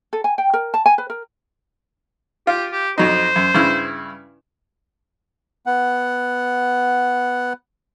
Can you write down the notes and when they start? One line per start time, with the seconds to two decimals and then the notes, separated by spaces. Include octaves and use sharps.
0.13 A4
0.24 G#5
0.38 G5
0.53 A#4
0.74 A5
0.86 G#5
0.98 B4
1.10 A#4
2.47 F4 G4
2.72 G4
2.98 F2 F#3 D#4 C5
3.36 F#2
3.54 G2 C#3 E4
5.66 B3 F#5